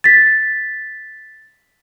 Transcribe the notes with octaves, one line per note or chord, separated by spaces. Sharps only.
A6 B6